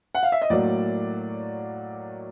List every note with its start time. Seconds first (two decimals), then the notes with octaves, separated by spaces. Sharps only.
0.15 F#5
0.23 F5
0.32 E5
0.42 D#5
0.50 A2 F#3 A#3 D5